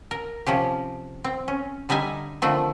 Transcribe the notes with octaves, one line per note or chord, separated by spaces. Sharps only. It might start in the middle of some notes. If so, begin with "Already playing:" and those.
A#4
C3 F3 C#4 G4
C4
C#4
D3 G3 D#4 E5 G#5
D3 D#3 F3 A3 C4